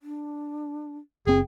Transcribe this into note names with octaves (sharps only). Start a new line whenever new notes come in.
D4
F#1 C4 G#4 G5